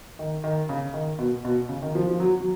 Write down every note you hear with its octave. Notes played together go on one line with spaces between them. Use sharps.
D#3
D#3
C#3
D#3
B2
B2
C#3
D#3
F3
F3
F#3
F#3